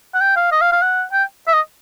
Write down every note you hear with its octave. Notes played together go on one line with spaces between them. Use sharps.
F#5
G5
F5
D#5
F5
F5
F#5
G5
E5
D#5